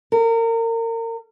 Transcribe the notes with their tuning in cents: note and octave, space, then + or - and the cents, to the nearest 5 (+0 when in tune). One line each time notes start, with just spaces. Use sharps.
A#4 -30